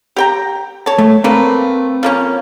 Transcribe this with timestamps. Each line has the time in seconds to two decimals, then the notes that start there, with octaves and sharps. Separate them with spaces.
0.16 G4 G5 A#5
0.86 C#5 A5
0.98 A3
1.24 A3 A#3 C4 B4
2.03 F3 A#3 C#4